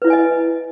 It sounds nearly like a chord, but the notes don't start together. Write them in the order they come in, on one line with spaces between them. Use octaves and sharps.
B4 E4 D5 G#5 D#5